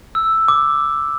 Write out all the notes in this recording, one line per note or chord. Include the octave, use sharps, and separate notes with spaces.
E6
D6